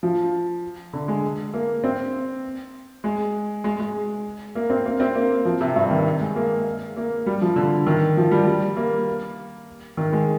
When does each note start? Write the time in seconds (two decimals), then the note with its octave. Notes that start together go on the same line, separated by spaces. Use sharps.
0.03 F3
0.93 D3
1.08 G#3
1.54 A#3
1.84 C4
3.04 G#3
3.64 G#3
3.80 G#3
4.55 A#3
4.70 C4
4.86 A#3
5.00 C4
5.15 A#3
5.45 F3
5.61 C3
5.76 G2
5.91 D#3
6.21 G#3
6.35 A#3
6.97 A#3
7.26 G3
7.41 F3
7.56 D3
7.87 D#3
8.17 F3
8.31 G3
8.46 G3
8.76 A#3
9.97 D#3
10.13 G#3